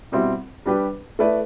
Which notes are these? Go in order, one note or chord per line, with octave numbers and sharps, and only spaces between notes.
B2 G3 C4 E4
G3 D4 G4 B4
A3 E4 B4 D5